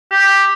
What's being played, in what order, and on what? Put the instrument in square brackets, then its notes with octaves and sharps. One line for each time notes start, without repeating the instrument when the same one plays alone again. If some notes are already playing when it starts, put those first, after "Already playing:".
[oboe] G4